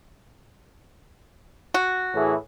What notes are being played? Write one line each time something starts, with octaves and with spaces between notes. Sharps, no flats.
F#4
A2 E3 G#4